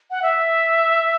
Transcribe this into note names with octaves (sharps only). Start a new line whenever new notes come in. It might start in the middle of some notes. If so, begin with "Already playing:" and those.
F#5
E5